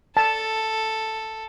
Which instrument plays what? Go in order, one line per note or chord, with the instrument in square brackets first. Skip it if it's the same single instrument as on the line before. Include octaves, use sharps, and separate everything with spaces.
[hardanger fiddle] A4 [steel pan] A5